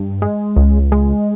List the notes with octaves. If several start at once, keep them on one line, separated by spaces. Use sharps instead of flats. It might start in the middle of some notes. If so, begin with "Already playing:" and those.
Already playing: G2
G#3
C#2
G#3